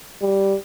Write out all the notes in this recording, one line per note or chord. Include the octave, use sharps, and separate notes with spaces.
G3